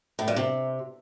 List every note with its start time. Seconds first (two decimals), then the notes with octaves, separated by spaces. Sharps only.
0.19 A2
0.28 G2
0.36 C3